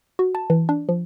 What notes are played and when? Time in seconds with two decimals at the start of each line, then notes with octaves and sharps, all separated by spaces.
0.19 F#4
0.35 A5
0.50 E3
0.69 D4
0.89 F3